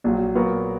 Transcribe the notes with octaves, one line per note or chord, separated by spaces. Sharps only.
A#1 A#2 F#3
A#2 F#3 B3 F#4 A#4